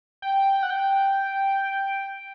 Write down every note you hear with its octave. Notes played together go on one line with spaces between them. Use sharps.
G5
G5
F#5
G5